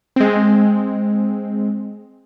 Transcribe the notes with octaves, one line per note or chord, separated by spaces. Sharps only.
G#3 C4